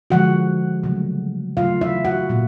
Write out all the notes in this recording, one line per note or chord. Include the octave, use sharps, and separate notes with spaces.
D3 F3 G#3 F#4 F#5
C#3 F#3 A3
C#3 F#3 A3 F4 F5
E4 E5
F#4 F#5
A#2 G3 A#3